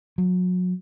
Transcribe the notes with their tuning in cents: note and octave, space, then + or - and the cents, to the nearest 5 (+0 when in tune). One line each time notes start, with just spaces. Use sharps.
F#3 -30